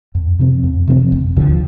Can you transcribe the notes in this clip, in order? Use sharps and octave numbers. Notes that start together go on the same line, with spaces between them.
F2
C3 F3 C4
F2
C3 F3 C4
F1
D#2 D3 F3